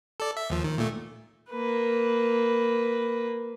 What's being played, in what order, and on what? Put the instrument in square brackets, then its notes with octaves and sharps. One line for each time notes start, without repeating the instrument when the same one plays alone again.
[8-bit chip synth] A4 D5
E5
D#2 F3
D#3
A#2 A3
[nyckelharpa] A#3 B4